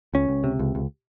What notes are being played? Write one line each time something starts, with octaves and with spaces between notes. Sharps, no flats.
C#2 C#4
C#2
C3
C#2
C#2